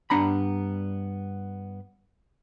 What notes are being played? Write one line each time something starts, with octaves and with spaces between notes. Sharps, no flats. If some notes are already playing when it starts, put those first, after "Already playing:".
G2 G3 B3 D4 A#5 B5